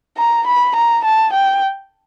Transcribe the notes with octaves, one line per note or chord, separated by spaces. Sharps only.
A#5
B5
A#5
A5
G5